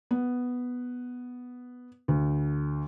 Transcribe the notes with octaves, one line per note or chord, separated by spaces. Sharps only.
B3
D2